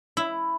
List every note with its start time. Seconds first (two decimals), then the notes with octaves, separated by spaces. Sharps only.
0.17 E4